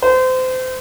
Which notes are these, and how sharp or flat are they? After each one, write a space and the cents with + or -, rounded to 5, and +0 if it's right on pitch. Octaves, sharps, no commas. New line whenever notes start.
C5 -30